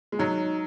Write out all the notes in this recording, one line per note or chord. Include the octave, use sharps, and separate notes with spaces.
G#3
F#3 D#4